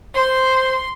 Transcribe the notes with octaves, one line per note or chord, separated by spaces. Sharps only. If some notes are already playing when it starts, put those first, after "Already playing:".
C5 C6